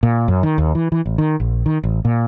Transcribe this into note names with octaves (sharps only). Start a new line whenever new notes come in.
A#2
F#2
D#3
D#2
E3
E3
A1
D#3
A#1
D#3
A1
A#2